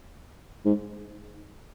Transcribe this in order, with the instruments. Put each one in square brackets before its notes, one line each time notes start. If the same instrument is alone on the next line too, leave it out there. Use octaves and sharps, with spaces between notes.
[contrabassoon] G#2